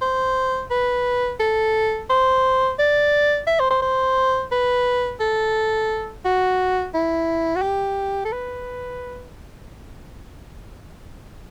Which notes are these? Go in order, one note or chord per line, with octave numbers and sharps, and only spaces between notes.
C5
B4
A4
C5
D5
E5
C5
C5
C5
B4
A4
F#4
E4
F#4
G4
A4
B4